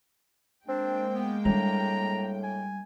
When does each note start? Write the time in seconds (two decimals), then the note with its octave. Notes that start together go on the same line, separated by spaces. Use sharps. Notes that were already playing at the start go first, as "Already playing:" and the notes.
0.68 G#3 A#3 C4 D4 G5
1.14 B3
1.45 A2 G3 D4 A#5
2.43 G#5